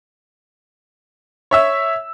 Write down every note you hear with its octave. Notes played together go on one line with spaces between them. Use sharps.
C#5 E5 E6